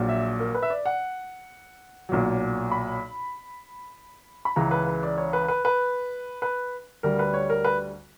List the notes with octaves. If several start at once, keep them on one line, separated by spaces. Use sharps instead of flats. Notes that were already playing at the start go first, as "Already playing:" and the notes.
Already playing: A#1 A#2 F#3
E5
A#4
B4
E5
D5
F#5
B1 A#2 F#3
B5
B5
C#2 C#3 E3 A#5
B4
B4
D5
C#5
B4
B4
B4
B4
D2 D3 G3 A#4
B4
C#5
A#4
B4